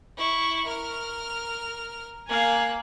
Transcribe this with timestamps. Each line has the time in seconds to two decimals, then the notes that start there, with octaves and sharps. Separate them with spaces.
0.17 E4 C#6
0.66 A#4 F6
2.29 A#3 F5 G#5 F#6